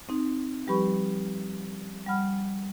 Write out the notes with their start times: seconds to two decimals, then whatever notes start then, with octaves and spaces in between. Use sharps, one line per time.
0.09 C4 D#4
0.67 F3 G3 G4 B4 B5 C#6
2.07 G3 F#5 B5 F6